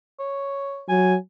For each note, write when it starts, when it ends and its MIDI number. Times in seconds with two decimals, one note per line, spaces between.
0.19 0.83 73
0.89 1.15 54
0.89 1.14 80